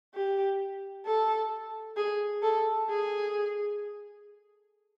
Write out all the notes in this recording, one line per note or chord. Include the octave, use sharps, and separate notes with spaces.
G4
A4
G#4
A4
G#4